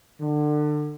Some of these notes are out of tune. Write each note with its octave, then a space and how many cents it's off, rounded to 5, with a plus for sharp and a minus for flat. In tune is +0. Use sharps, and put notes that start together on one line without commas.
D3 +30